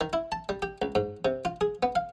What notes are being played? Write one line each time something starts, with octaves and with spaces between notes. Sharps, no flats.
D#3
E4
A5
G3
G4
C#2
G#2
C3
F4
G#4
B3
F5